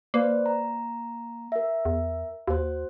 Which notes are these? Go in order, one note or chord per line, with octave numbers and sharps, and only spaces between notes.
A#3 B4 C5 D5
A#5
A#4 E5
E2
D#2 F#4 C5